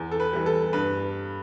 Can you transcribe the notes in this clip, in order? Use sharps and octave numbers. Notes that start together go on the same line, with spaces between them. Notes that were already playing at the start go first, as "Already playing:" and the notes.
Already playing: E2
A4
B4
E3 G3
A4
G2 B4